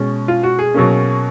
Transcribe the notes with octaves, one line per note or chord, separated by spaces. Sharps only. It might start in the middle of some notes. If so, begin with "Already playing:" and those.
Already playing: B2 G#3 C#4
F4
F#4
G#4
B2 F#3 A#3 C#4